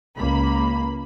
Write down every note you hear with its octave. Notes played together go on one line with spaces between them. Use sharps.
C#2 A#3 B5